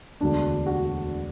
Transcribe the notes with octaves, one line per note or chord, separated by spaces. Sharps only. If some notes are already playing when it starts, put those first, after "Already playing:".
E1 D2 D3 D4
F#4